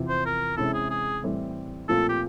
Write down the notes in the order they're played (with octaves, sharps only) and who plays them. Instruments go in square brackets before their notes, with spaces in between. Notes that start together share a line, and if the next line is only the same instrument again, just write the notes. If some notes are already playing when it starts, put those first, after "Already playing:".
Already playing: [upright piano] E2 C3 F3
[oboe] C5
A#4
[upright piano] C3 E3 G#3 C#4 E4 [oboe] A4
[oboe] G#4
G#4
[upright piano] A2 E3 G3 C4
[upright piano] A#2 F3 A3 C4 F4 [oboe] A4
[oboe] G4